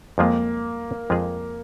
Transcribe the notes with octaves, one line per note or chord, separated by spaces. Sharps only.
F2 F3 G#3 A#3 F4 G#4
F2 F3 G#3 F4 G#4